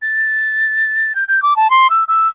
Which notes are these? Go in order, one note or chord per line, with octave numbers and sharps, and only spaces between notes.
A6
G6
G6
D6
A5
C6
E6
E6